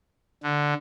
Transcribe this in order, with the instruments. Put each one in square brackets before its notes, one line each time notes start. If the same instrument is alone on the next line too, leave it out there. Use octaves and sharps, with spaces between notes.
[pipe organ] D3